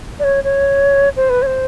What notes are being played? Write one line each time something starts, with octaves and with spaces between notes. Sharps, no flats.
D5
C#5
C#5
C5
B4
C#5
C5